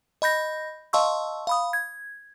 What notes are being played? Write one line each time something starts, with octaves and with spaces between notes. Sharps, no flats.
D#5 B5 G6 A#6
D#5 F5 A5 C6 C#6 E6
F5 B5 D#6
G#6